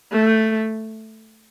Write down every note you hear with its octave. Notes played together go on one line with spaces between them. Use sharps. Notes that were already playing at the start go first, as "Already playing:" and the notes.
A3